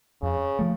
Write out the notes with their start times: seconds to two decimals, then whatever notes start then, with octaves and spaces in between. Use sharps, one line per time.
0.23 F2 C#3
0.59 F3 A3